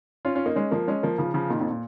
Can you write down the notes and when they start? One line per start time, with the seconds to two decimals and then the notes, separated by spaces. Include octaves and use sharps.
0.25 C#4 F4
0.35 C#4 F4
0.46 A#3 D#4
0.56 G#3 C#4
0.71 F3 A#3
0.88 G#3 C#4
1.03 F3 A#3
1.18 C#3 F3
1.34 C#3 F3
1.49 A#2 D#3
1.60 F2 A#2
1.71 A#2